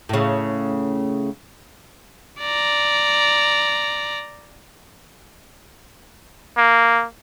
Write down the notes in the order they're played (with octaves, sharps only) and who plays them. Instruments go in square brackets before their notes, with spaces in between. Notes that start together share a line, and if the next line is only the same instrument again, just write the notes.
[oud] A2 C#3
[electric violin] D5 A#5
[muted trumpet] A#3